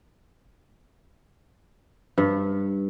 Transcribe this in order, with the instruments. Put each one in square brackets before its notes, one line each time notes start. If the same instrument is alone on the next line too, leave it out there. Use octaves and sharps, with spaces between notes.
[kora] G2